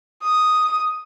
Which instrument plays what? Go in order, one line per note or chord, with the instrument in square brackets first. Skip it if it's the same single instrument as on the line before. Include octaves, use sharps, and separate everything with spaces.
[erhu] D#6